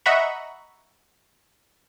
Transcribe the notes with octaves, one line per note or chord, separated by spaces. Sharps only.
D#5 E5 F#5 A#5 B5 C#6